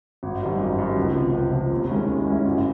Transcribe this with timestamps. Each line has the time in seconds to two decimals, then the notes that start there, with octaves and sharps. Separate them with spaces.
0.23 G#1
0.42 F#2 D#3 G3
0.60 G#1
0.78 F#2 D#3 G3
0.97 C#2
1.15 C3 F3
1.34 C#2
1.53 C3 F3
1.71 D#2
1.90 D#3 G#3 C#4 E4
2.08 D#2
2.26 D#3 G#3 C#4 E4
2.45 G#1